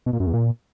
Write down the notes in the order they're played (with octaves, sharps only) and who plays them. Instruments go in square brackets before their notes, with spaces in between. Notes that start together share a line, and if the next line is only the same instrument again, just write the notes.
[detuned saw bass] B2
A#2
F#2
E2
A#2